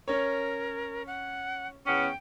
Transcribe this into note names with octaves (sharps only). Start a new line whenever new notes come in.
C#4 A#4 C#5
F#5
E2 B3 C#4 G5